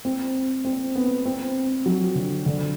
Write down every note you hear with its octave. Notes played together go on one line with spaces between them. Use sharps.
C4
C4
B3
C4
F#3
D3
D3